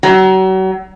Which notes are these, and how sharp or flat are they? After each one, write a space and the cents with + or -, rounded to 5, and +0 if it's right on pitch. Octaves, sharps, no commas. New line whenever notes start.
F#3 +35